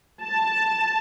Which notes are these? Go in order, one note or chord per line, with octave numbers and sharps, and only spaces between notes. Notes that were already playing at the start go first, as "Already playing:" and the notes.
A5